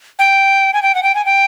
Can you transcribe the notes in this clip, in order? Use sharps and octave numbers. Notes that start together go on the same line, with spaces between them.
G5
G#5
G5
F#5
G5
G#5
G5